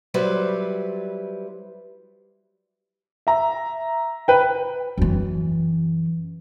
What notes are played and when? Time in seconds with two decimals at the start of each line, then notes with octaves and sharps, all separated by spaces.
0.14 F#3 G3 E4 B4 C5
3.27 E5 A#5
4.28 B4 G5
4.98 F#2 E3